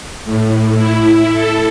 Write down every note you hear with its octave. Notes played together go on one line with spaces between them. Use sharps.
A2
E4
A4